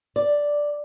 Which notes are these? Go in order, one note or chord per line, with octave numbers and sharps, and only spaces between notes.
D5